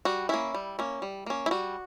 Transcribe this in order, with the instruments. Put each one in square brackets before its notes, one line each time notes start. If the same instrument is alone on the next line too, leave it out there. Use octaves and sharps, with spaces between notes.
[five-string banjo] G3 F#4
A#3 C#4 E4
G3
A#3 C#4
G3
A#3 C#4
E4
G3 F#4